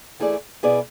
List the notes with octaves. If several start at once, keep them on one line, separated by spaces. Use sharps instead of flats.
E3 A3 E4 G#4 D5
B2 B3 E4 G#4 D5